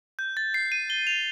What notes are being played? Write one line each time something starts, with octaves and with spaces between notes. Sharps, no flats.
G6
A6
C7
D#7
G7
F7